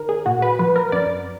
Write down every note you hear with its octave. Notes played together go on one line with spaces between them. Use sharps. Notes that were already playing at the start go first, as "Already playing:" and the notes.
Already playing: D#3 A#4
G#4
A#2 F#4
B4
F3 B4
A#4
F#2 D5